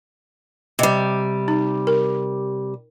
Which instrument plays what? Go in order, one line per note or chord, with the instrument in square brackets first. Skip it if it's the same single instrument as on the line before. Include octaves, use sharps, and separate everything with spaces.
[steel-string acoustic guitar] C3 G3 [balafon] D#5
[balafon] D#4
A#4